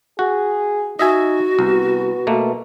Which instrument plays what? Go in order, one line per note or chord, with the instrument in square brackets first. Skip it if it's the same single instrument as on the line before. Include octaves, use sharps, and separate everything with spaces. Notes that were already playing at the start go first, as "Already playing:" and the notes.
[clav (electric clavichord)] F#4 [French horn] G#4
[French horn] D#4 [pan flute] F#4 [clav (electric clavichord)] D#5 E5 G#5
[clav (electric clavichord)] C2 [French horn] B3
[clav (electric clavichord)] B2 A3 A#3